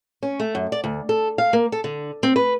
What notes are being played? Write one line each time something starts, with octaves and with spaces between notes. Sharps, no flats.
C#4
A3
F#2
D5
D2
A4
F5
A#3
A4
D3
C4
B4